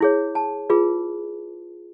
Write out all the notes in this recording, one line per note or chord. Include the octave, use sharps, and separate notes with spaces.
E4 G#4 C#5
A5
F4 G#4 B4